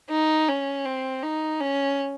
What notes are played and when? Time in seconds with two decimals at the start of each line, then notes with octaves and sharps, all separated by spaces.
0.11 D#4
0.48 C#4
0.86 C4
1.23 D#4
1.60 C#4